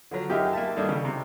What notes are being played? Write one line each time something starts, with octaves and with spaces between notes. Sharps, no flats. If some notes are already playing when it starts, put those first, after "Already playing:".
D3 F3 F#3
F#2 D#4 G4 G#4 E5 F6
A#3 E5 A5
G2 D#3 D4 A4
C#3
C3